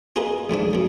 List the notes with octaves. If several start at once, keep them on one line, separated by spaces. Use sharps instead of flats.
F4 G#4 A#4 B4 D#5
A1 G#2 C#3 D4
F2 B2